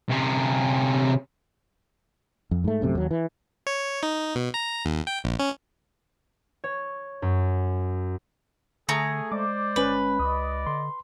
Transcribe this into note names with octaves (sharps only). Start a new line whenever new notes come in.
C3 C#4
F2
G#2 A3
A#1 F#2 C3 A3
D#2 F#3
E3
C#5
D#4
B2
A#5
D#2
G5
A#1
C#4
C#5
F#2
D3 A3 G#4 A#5
G#3 C5 D5 D6
G1 C#4 B4
C#2 D5 D#5 D#6
D3 C6